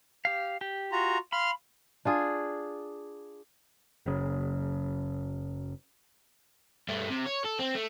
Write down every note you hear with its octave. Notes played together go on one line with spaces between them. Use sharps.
G4 F5
G4
F4 F#4 A#5
F5 B5 C6 F6
D4 F4 G#4
F#1 C#3
G2 A3
C3
C#5
A4
C4
A3